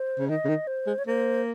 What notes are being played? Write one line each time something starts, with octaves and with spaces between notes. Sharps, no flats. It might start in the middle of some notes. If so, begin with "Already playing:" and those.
Already playing: C5
C#3
D#3 D#5
C#3
D#3
C5
G#3
C#5
A#3 C5